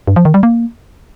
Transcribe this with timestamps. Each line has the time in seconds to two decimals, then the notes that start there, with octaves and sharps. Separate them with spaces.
0.07 G2
0.16 F3
0.25 D#3
0.34 G3
0.43 A#3